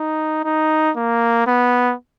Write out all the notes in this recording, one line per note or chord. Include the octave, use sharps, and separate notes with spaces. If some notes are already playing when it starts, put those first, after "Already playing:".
Already playing: D#4
D#4
A#3
B3